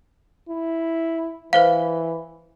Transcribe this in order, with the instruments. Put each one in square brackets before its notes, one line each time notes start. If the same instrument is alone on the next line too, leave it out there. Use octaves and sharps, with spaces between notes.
[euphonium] E4
[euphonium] E3 [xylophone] B4 C5 F5